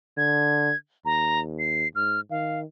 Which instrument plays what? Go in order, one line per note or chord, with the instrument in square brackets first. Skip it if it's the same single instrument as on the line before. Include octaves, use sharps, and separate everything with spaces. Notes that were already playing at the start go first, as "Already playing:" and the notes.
[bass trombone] D3 [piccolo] G#6
[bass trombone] D#2 [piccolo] A#5
[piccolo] C7
[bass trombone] G#2 [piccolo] F6
[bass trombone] D#3 [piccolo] F5